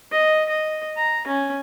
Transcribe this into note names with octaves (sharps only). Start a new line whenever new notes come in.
D#5
D#5
A#5
C#4